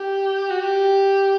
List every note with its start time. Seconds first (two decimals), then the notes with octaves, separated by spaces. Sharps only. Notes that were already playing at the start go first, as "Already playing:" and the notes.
Already playing: G4
0.50 F#4
0.60 G4